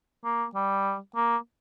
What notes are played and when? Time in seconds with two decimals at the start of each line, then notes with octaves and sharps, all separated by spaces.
0.24 A#3
0.54 G3
1.15 A#3